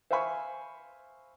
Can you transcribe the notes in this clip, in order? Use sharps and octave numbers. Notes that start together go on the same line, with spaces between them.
C5 E5 F5 G#5 B5 C#6